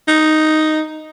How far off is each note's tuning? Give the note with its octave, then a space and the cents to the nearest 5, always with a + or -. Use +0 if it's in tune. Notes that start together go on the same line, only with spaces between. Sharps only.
D#4 +0